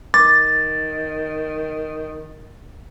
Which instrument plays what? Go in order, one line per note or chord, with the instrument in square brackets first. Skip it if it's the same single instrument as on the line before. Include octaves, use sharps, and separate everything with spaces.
[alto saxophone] D#3 [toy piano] D6 [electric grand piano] A6